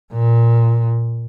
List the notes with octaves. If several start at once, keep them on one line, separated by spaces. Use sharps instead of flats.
A#2